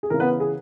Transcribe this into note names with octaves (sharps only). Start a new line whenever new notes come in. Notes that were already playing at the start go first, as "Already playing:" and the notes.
G#4
C#3 E3 A#4
B3 B4
G#4